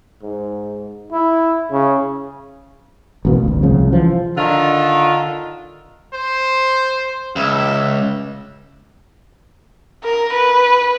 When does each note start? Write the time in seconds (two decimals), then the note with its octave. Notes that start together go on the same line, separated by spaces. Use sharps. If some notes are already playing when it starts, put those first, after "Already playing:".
0.22 G#2
1.12 E4
1.71 C#3
3.25 A1 B2 A#3
3.44 G#1 D2
3.63 C2 C#3 F3
3.93 E3 F3
4.37 D3 D#3 D4 F4
6.14 C5
7.36 C#2 E5
10.04 A#4
10.33 B4